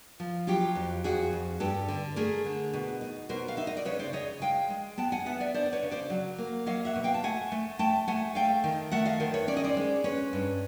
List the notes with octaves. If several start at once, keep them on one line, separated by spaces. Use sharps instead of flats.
F3
F#3 F4 G4
F2
F2 F#4 G#4
F2
G2 G4 A4
D3
A3 G#4 A#4
D3
B2
D#4
B2 A#4 C5
F5
D#4 E5
D#5
D5
C#3 B4 C#5
C5 D5
C#3 C#5 D#5
G#3 F5 G5
G#3
B3 G5 A5
F#5 G#5
B3 E5 F#5
D5 E5
D4 C5 D5
C5
B4 C#5
C#3
C5 D5
F#3
A#3
F#3 D#5 F5
E5 F#5
B2
F5 G5
A5
A3 F#5 G#5
A3
A3 G5 A5
A3 F#5 G#5
A3 F5 G5
D#3
A3 E5 F#5
D#5 F5
D#3 A#4 C5
B4 C#5
C#4 D5
D#5
C5 D5
G#3
C#4 B4 C#5
G2